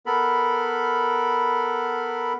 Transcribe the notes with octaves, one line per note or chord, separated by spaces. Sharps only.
B3 A4 A#4 B5